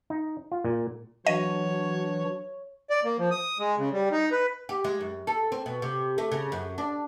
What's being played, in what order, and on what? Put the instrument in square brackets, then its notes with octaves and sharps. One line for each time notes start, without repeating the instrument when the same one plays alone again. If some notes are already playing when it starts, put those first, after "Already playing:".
[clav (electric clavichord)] D#4
F4
A#2
[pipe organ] E3 D4 F#4 [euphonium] F#3 [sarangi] C#5 [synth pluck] D#5
[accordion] D5
A#3
F3
D#6
G#3
C#3
G3
D#4
B4
[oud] G4
G#3
F#2
A4
C4
B2
C3
A3
C#3
F#2
D4